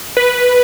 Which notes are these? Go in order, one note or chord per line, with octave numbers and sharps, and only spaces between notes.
B4